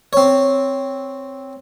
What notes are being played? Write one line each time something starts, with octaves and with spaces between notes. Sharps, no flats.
C4 C#5